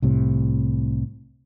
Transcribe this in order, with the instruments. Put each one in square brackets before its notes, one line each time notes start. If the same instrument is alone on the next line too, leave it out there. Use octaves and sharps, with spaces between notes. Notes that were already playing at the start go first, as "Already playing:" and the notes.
[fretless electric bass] C2 A2 C3